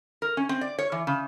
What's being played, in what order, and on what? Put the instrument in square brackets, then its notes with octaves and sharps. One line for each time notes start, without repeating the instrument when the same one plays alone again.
[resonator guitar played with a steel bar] A#4
C#4
C4
D5
C#5
E3
C#3